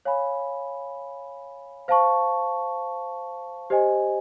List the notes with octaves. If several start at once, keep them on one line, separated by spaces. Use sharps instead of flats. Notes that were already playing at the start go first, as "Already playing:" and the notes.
C#5 F5 G#5 B5
C5 F5 A5 C#6
G4 C5 D#5 G#5